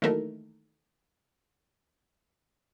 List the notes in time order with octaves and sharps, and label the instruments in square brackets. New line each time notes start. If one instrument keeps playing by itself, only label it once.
[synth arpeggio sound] D#3 E3 F#3 A3 A#3 A#4